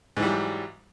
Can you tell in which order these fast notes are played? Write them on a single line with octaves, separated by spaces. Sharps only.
G#2 E3 G3 F#3